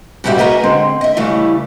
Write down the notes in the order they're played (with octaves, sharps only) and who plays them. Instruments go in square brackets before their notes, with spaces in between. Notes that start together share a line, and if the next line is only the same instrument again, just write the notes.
[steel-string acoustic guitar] G#2 C#3 G3 F#4 G4 E5
F#4 G#4 A#4 B4 D#5
D3 G#3 C4
D#5 E5
C#3 E3 G3 A3